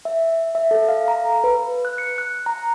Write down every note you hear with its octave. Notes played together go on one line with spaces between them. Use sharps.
E5
E5
A4
F5
A#5
B4
F#6
C#7
F#6
A#5